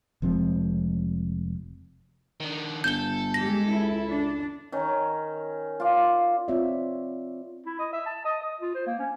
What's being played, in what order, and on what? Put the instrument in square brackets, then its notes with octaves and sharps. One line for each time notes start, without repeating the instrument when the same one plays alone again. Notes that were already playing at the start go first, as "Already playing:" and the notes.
[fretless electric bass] F1 F3 G#3 C4
[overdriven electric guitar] D#3 D4
[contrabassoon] G1 [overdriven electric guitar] A4 [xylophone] G6 G7
[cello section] G#3 G4 [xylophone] A#6
[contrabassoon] C#2 [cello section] E4
[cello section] D4
[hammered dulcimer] D#3 C#4
F4 D5
[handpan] C4 F4 C#5 D5 E5
[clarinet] E4
D#5
E5
A5
D#5
D#5
F4
C5
A#3
C#4